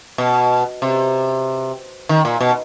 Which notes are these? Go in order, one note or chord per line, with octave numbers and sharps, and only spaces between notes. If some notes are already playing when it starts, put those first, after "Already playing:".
B2
C3
D#3
A#2
B2